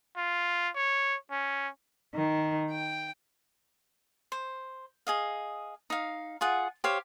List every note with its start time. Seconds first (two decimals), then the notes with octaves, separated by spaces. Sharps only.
0.17 F4
0.76 C#5
1.31 C#4
2.15 D#3
2.71 G5
4.32 C5
5.07 G#4 D#5 F5
5.90 D#4 F5
6.41 F4 G#4 F#5
6.84 G4 C5 C#5 F5